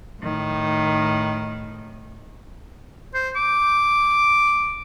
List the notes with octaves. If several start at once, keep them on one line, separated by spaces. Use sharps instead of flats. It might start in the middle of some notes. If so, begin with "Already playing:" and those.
A2 D#3
C5
D6